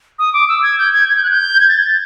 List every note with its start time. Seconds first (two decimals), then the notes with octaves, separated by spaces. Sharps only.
0.19 D#6
0.34 D6
0.49 E6
0.63 G#6
0.78 G6
0.93 G#6
1.09 G#6
1.16 G6
1.23 F#6
1.30 G6
1.60 G#6
1.68 A6